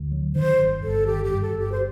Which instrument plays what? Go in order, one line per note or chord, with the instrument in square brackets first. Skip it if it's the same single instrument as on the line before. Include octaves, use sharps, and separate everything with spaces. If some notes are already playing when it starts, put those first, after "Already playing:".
Already playing: [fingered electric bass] D2
F#3
[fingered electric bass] D#3 [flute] C5
[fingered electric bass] G1
[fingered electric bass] G1 [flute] A4
[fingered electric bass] D#3 [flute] G4
[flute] G4
[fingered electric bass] G2
[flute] A4
[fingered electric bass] G1
[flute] G4
C5